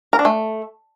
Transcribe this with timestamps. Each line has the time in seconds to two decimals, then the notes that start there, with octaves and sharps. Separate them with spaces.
0.13 A#4
0.19 D4
0.25 A3